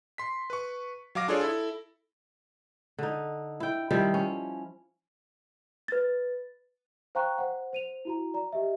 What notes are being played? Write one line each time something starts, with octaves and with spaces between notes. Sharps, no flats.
C6 B6
B4 C#6
F#3 F5 D6 A#6
D4 F4 G#4 A4 C#5 D5
E4 A4
D3 D#4
E4 G5
D#3 F3 G3 E4
C#4
B4 A6
C5 F5 G5 A#5 C#6 F#6
C5 F#5
C5 D#7 F7
E4 F#4 A#5
D5 A#5
G4 D#5 E5